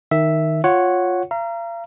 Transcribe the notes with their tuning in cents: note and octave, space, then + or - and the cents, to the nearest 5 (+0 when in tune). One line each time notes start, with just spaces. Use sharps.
D#3 +0 E5 +0
F4 +15 C#5 +0 F#5 +0
F5 -40 A#5 +0